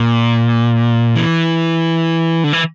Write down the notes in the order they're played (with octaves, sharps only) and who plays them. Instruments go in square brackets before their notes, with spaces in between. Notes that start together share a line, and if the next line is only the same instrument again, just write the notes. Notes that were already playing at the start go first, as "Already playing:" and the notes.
Already playing: [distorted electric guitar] A#2
E3
D3
E3